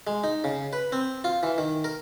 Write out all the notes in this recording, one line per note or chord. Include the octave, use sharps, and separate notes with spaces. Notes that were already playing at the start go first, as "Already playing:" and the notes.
G#3
D#4
C#3
B4
C4
F4
E3
D#3
A#4